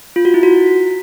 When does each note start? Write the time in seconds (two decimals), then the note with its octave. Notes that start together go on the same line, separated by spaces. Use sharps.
0.16 F4
0.25 F#4
0.34 E4
0.43 F#4